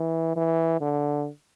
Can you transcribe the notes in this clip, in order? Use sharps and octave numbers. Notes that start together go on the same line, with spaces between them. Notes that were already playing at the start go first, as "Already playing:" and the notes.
Already playing: E3
E3
D3